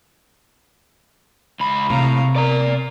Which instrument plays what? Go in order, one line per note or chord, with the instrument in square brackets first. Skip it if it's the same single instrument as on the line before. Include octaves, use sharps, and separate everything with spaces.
[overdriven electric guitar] C#2 B5
[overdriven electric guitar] A2 [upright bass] C3 [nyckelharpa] F5 A#5
[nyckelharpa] A#4 [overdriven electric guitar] D5 A#5